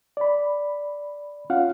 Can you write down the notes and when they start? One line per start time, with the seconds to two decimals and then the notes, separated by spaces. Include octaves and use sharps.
0.17 D5 B5
1.50 C#4 F4 F5 F#5